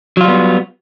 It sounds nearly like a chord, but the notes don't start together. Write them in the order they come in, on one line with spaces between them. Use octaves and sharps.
F#3 F4 G3 B3